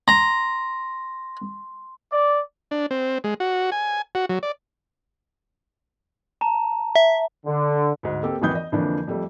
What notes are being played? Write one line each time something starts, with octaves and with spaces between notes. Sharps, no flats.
A#5 C6
D5
D4
C4
G#3
F#4
G#5
F#4
F#3
D5
A5 A#5
E5
D3
D2 G#2
A#3 C4 G4 A4
G#1 F2 D#3 E3 D#6 G6
D#5
F2 D3 E3 F3 A#3 D4
F2 G3 A3